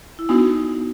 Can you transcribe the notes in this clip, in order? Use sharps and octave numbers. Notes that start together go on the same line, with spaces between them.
E4
B3 D4 D#4 F#4